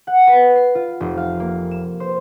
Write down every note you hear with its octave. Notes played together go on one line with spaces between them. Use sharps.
F#5
B4
C7
F4
F1
F5
A#3
E7
C5